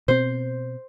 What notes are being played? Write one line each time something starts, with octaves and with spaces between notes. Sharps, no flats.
B2 C4 C5